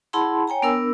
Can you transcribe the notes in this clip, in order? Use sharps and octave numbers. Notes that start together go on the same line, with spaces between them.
E4 G#4 F#5 A5 B5 C6
C#5 G5 G#5 A#5
B3 D4 A#4 E6